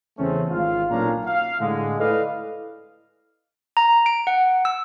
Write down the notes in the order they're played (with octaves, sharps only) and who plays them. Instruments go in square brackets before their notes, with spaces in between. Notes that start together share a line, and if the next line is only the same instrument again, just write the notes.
[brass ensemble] E2 C#3 A3 C4 C#4
G#1 F4 F5
B1 A#2 C#4 D4 F5 A#5
F5
A2 D3 G#3
E4 A4 B4 D5 D#5 F5
[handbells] A#5
D7
F#5
E6